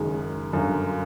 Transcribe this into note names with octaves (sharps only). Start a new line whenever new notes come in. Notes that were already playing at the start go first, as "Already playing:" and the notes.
Already playing: F#1 F#2 D#3 G#3
G1 F#2 D3